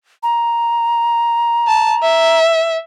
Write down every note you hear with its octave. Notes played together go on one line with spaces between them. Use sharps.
A#5
A5
E5